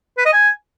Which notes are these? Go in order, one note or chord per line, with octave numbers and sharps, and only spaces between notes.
B4
D#5
G#5